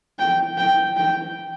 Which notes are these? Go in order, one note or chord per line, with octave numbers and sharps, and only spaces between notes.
G5
G5
G5